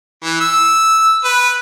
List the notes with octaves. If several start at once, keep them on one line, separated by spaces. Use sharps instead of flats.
E3
E6
B4